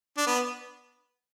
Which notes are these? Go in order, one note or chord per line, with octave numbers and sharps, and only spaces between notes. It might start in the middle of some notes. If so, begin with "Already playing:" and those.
D4
B3